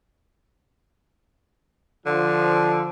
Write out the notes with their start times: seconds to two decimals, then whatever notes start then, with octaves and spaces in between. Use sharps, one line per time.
2.06 D3 F3